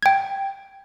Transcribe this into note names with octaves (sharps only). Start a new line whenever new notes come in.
G5 G#6